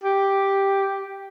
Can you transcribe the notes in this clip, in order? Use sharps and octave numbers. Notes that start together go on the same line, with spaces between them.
G4